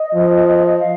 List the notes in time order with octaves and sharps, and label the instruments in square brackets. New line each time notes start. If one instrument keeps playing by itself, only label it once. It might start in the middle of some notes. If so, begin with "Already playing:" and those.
Already playing: [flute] D#5
[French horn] F3
[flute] F5